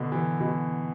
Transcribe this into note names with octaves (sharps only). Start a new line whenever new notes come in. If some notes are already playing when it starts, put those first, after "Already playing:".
Already playing: B2 D3
E3
B2